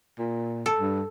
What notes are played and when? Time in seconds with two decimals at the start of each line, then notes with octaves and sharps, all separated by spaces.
0.18 A#2
0.66 A4
0.79 G2